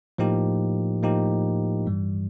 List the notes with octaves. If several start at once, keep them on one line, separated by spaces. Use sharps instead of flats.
A2 F3 A#3 D#4 G4
A2 F3 A#3 D#4 G4
G2 E3 G3